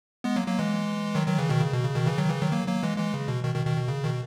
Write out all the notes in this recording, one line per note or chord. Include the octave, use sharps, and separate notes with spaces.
G#3 B3
F#3 A#3
F#3 A#3
E3 G#3
D#3 F#3
D#3 F#3
C#3 E3
B2 D#3
C#3
B2
C#3
B2 D#3
C#3 E3
D#3 F#3
C#3 E3
D#3 F#3
F#3 A#3
F#3 A#3
E3 G#3
E3 G#3
C#3
B2
B2 D#3
B2 D#3
B2 D#3
B2
C#3
B2 D#3